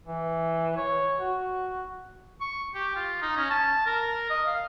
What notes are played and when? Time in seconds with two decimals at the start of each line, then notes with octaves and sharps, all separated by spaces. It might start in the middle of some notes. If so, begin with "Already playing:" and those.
0.06 E3
0.77 C#5
1.19 F#4
2.41 C#6
2.75 G4
2.96 F4
3.22 D#4
3.36 C#4
3.50 A5
3.87 A#4
4.30 D#5
4.47 F5